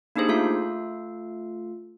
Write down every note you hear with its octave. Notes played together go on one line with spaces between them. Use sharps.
A#3 D4 D#4 G4 G#4 C5
A3 F4 A4 F5